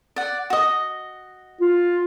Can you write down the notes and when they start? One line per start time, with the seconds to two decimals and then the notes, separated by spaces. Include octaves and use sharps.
0.16 D5 F#5
0.50 F#4 D#5
1.61 F4